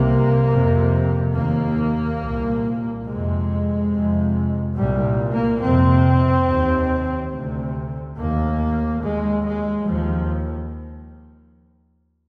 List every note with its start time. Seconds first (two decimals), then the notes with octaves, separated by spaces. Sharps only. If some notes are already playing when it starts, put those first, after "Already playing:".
Already playing: C2 C3 A#3
0.50 F2 C3
1.34 D#2 A#3
2.20 C2 A#2
3.05 F2 C3 G#3
3.90 F2 C3
4.75 C2 A#2 G3
5.32 A#3
5.61 F2 C3 C4
6.45 D#2
7.31 D2 C3
8.16 D#2 A#3
9.01 D#2 G#3
9.44 G#3
9.86 D#2 F3